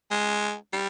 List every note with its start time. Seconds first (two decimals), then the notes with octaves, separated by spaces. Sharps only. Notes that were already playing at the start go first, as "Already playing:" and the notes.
0.11 G#3
0.73 G3